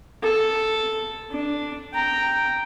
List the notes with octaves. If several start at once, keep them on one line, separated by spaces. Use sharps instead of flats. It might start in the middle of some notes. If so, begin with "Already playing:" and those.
A4
D4
G5 A#5